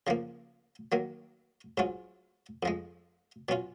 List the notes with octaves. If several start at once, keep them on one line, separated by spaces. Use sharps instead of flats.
C#3 F3 A#3
D#3 F#3 A#3
G#2 F#3 C#4 F4
F2 F3 G#3
B2 F#3 C#4 F4